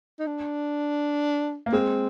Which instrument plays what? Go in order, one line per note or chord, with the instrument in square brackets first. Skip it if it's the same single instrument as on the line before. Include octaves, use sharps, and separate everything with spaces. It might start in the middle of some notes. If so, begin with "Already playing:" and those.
[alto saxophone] D#4
D4
[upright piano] A#3
[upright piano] G#3 [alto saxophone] C4